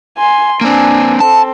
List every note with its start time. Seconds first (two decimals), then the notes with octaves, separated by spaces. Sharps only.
0.17 G#5 C6
0.61 A#3 C4 D4 G#5
1.20 C4 A4 A5